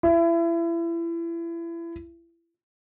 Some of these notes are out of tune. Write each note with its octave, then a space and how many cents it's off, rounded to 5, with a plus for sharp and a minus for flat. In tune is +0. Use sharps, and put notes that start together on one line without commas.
E4 +30